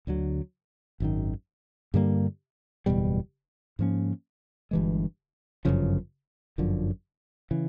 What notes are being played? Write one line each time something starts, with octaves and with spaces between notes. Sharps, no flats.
D2 D3 F#3
G#1 F#2 D#3
G2 D3 G3 A#3
F#1 E2 B2 G3
G#2 F3 A#3 C#4
G1 G2 E3 G#3
G1 F#2 C#3 F3
G1 F#2 D3 F3
C#3 E3